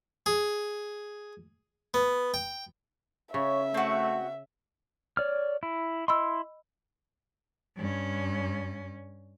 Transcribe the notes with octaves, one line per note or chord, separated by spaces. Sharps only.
G#4
B3
G5
C#3 C#5 E5
A3 C4 F#4
C#5 D5 F6
E4
E4 D#5 B5 C6 E6
G2 C#4